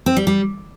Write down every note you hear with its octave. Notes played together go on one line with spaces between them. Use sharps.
C4
G3
G3